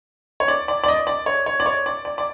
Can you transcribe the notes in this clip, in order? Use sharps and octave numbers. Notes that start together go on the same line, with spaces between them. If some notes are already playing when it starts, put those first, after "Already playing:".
C#5
D5
D5
D5
D#5
D5
C#5
C#5
D5
C#5
D5
D5
D5